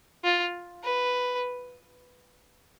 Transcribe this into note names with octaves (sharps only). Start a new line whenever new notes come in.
F4
B4